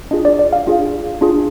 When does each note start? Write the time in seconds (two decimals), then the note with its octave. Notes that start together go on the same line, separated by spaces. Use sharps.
0.11 D4 F4 G#4 D#5
0.25 D5
0.39 D5
0.53 F5
0.67 D4 F4 G#4
1.21 D4 F4 G#4